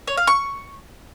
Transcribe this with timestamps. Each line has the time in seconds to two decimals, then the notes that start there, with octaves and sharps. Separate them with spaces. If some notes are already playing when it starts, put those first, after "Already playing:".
0.07 C#5
0.17 F5
0.27 C#6